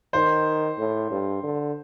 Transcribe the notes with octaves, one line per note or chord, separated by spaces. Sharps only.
D#3 C5
A2
G2
D3